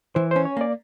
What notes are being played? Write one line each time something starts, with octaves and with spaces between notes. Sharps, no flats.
E3 C5
C#4 C5
C#5
A#3 D5